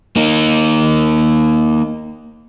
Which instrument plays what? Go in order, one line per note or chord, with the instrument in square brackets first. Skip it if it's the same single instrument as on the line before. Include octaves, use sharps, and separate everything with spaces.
[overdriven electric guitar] A#3 D#4